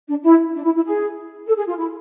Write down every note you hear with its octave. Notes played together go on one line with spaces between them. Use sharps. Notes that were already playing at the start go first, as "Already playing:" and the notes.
D4
E4
D4
E4
E4
G#4
A4
G#4
F4
E4